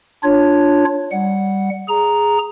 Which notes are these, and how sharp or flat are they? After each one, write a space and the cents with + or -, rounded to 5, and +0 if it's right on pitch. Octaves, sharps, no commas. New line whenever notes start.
D4 +0 F4 +0 C#5 +0
G3 +0 F#5 +0
G#4 +0 A#5 +0